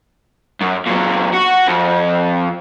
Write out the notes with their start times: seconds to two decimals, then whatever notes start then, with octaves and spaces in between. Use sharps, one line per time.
0.61 F#2
0.86 A#2 F#3
1.33 F#4
1.67 F2